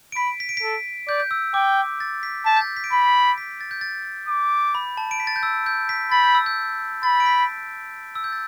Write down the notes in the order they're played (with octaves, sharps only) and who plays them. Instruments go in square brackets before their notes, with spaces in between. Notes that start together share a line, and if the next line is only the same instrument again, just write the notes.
[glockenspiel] D7
[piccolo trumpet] B5 [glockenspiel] B6
[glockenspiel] B6
D7
B6
[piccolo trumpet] A4
[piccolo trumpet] D5 [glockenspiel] G6
[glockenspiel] G6
E6
[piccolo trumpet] G5 [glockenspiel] D6
[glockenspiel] A6
B6
[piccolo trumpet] A5 [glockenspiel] B6
[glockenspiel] G6
A6
B6
D7
[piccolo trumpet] B5 [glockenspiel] B6
[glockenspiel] B6
A6
G6
A6
[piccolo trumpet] D6
[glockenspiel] B5
A5
D7
B6
A6
G6
E6
G6
B6
[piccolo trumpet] B5 [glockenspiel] A6
[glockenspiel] G6
E6
G6
[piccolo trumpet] B5 [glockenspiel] A6
[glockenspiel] D7
B6
E6
G6
A6